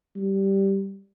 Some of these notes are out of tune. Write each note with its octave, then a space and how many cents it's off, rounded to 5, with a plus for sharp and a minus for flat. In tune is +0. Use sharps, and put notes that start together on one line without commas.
G3 -10